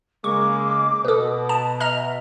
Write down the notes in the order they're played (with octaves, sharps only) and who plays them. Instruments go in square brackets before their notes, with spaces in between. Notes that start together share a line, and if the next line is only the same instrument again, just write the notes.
[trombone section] C#3 G#3 A#3 [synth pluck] C#6 [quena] D6
[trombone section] B2 [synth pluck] A4 B4 [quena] D#6
[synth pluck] A5
[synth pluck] D#5 A#5 F6 [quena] E5